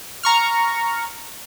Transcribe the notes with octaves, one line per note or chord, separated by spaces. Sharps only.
A#5 C#6 F6